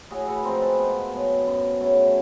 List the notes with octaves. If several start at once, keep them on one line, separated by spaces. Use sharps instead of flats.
A2 F#4 G#4
A4 B4
F3 G#3 C4 A#4 C5
A4 B4
B2
F#3 B3
F#2
C#3 F#3 A3